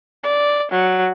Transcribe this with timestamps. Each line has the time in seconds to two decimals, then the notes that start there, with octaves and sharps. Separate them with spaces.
0.23 D5
0.71 F#3